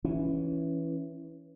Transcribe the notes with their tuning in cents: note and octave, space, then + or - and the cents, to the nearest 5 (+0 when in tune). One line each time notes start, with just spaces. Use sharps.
E3 +0 C#4 +0